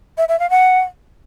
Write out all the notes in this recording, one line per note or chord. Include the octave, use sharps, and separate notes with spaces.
E5
E5
F5
F#5